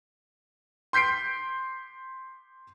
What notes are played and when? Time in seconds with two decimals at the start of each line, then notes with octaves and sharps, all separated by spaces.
0.93 C6 G6 B6 C7 D7